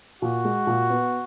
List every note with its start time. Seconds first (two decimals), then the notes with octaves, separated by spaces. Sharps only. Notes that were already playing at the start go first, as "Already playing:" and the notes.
0.22 A#2 F#4
0.45 G#3
0.67 A#2
0.90 B3